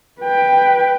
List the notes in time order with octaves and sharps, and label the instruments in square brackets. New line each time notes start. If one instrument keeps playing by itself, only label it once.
[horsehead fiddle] B4 G5